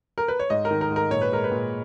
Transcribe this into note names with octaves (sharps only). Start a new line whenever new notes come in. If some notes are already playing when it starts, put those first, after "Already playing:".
A#4
B4
C#5
G#2 D#5
A#4
D#3
A#4
G#2
A#4
A#2 C#5
B4
G#3 A#4
B4
A#2